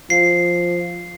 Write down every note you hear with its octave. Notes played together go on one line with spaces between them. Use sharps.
F3 C7